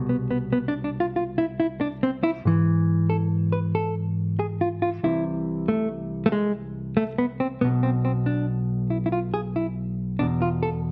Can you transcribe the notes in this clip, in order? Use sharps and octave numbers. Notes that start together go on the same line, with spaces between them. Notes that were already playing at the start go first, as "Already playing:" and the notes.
Already playing: C2 B2
B3
B3
B3
D4
D4
F4
F4
E4
E4
D4
C4
E4
G#2 E3
A4
B4
A4
G#4
F4
F4
C2 C3 E3 E4
A3
A3
G#3
A3
B3
C4
B1 B2 B3
C4
C4
D4
E4
E4
F4
G#4
E4
E2 B2 D4
F4
A4